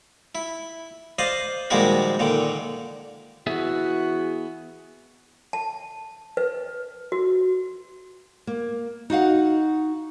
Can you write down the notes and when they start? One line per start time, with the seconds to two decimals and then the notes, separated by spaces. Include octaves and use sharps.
0.35 E4
1.19 C5 D5 D#5 F5
1.70 A#2 D#3 F3 G3 G#3 F#4
2.19 A#2 D3 D#3
3.47 E3 B3 F#4 G#4 E5
5.53 A5
6.37 B4
7.12 F#4
8.47 A#3
9.10 D#4 F#4 F5 F#5